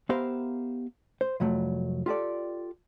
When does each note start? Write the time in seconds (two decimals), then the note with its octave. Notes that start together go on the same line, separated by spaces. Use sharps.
0.09 B3 G4 A#4 C5 E5 F5
1.21 C5
1.40 C2 F2 F#3 A3
2.06 F4 G4 A4 D5